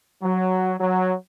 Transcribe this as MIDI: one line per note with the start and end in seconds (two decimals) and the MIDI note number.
0.23 0.74 54
0.80 1.14 54